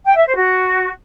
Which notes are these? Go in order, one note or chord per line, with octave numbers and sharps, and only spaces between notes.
G5
E5
C5
F#4